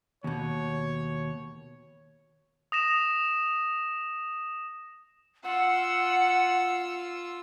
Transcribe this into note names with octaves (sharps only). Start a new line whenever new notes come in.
D#2 B2 C#5
D#6 A#6 E7
F4 F#5 E6